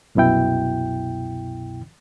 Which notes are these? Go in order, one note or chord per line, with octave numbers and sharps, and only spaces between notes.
C2 F#2 B2 E4 G5